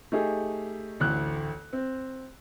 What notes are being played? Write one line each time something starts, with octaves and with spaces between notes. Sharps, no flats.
A3 D#4 G4 G#4
A1 D2 F#6
C4